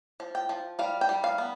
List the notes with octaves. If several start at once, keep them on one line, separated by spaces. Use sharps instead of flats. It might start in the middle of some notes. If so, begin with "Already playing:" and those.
F3
G5
F3
G3 F5
G5
G3
F5
B3